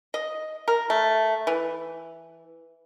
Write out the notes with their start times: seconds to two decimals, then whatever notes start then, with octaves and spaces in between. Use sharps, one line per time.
0.14 D#5
0.68 A#4
0.90 A3
1.47 E3